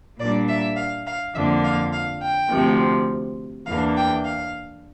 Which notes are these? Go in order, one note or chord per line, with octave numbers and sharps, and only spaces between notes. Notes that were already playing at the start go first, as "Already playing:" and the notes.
A#2 G3 A#3 D4 D5
E5
F5
F5
F2 D3 F3 A#3 D4 E5
F5
F5
G5
D2 C3 F3
E2 E3 A#3 D4 F5
G5
F5